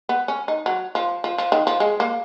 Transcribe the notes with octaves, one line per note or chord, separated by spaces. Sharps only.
B3
C#4
D#4
F#3
F3
F3
F3
D#3
F3
G#3
A#3